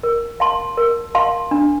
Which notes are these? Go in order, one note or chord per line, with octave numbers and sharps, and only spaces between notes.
A#4
F5 A5 C6
A#4
F5 A5 C6
D4